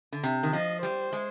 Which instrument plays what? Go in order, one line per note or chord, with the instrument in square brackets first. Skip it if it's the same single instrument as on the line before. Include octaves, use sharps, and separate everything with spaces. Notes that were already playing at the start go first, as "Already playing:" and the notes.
[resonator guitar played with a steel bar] D3
C3
D#3
[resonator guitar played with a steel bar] F3 [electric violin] D#5
[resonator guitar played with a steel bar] G3 [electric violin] C5
[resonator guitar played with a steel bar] G#3